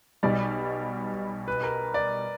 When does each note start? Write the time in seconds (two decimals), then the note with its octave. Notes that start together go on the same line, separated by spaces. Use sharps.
0.23 B1 B2 G3 D5
1.48 B4
1.63 A#4
1.94 D5